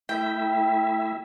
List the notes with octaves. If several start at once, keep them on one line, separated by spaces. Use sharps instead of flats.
A3 E4 E5 G5